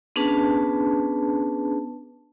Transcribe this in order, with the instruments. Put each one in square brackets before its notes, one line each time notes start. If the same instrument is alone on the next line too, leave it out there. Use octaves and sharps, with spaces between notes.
[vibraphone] B3 C#4 D4 G#4 B4 A5